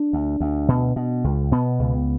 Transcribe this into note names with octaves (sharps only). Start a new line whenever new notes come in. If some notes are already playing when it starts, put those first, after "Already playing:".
Already playing: D4
D2
D2
B2
B2
C#2
B2 B3
C#2